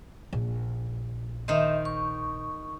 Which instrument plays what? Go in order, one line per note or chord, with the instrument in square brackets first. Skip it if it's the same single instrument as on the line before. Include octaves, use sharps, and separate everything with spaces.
[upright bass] A#1
[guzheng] D#3 D#4 C5 [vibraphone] D#5 E5
[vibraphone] C#6